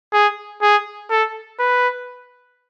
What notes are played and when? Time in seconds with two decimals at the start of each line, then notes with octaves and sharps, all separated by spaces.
0.13 G#4
0.62 G#4
1.10 A4
1.59 B4